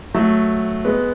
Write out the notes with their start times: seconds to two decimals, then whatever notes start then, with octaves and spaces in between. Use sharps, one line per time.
0.14 F#3 A3
0.85 G#3 B3